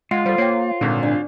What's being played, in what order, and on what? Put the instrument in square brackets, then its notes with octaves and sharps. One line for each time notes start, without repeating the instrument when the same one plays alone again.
[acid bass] G#3 [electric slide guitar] F4 [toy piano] F#5
[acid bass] G3 [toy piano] A4 C5
[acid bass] A#3 [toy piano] C#5 G5
[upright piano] G#1 D3 [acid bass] A#2 [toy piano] D#4
[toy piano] D4 D5